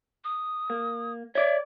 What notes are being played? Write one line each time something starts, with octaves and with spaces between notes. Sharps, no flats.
D#6
A#3
C#5 D5 E5